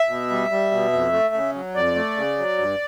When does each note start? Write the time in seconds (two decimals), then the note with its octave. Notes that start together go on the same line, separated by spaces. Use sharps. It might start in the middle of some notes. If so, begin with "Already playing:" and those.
Already playing: E5
0.09 B2
0.30 G3
0.51 G3
0.72 B2
0.93 F2
1.13 A3
1.34 C#3
1.54 F#3
1.75 F2 D5
1.95 A3
2.17 C#3
2.38 F#3
2.58 G2